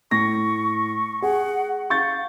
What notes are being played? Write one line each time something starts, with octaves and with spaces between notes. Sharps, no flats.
A2 C#6 A#6
G#4 F#5
F5 C#6 G6 A6